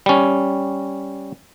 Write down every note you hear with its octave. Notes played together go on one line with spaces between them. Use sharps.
G3 C#4